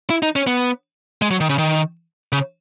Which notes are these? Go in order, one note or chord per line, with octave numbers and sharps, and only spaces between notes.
E4
D#4
C#4
B3
G#3
F#3
D#3
C#3
D#3
C#3